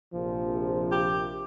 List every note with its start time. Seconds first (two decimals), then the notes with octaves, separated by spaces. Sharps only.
0.14 A#1 C3 F3
0.92 G4